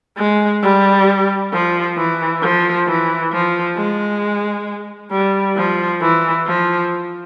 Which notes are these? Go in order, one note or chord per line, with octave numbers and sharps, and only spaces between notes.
G#3
G3
F3
E3
F3
E3
F3
G#3
G3
F3
E3
F3